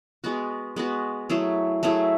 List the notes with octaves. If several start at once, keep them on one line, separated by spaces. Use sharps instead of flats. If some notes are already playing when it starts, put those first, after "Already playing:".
G#3 B3 F#4
G#3 B3 F#4
F#3 A3 E4 G#4
F#3 A3 E4 G#4